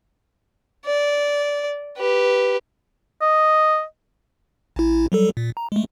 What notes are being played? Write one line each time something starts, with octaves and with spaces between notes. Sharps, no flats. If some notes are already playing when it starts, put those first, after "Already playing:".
D5
G4 B4
D#5
A1 E4
F#3 G3 A4
A#2
A#5
G#3 A3